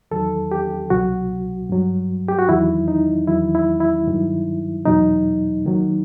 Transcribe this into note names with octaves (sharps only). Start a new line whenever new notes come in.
E2 D#3 F#3 A4
G4
C2 B2 F#3 F#4
G2 F#3
G4
F#4
E2 D#3 F#3 E4
D#4
E2 D#3 F#3 E4
E4
E4
G2 D#3 F#3
E2 B2 F#3 D#4
D#2 D#3 F#3